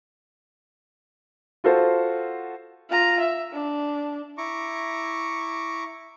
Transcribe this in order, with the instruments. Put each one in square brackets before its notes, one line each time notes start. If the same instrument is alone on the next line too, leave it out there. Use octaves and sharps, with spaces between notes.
[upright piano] F4 F#4 A4 C5
[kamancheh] F4 A#5
E5
D4
[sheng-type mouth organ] E4 A#5 C#6 D6